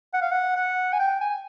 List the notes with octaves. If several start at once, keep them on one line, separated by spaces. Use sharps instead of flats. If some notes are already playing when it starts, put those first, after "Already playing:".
F#5
F5
F#5
F#5
G#5
G5
G#5